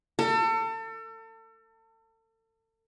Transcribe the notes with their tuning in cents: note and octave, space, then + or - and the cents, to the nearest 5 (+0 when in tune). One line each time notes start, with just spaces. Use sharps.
A4 +35